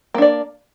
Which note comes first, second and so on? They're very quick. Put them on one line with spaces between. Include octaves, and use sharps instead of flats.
A#3 D4 D5